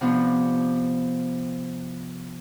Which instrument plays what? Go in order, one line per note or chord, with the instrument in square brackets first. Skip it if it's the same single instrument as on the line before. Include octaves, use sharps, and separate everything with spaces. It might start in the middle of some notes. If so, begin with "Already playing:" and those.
[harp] C3 F3 B3 D4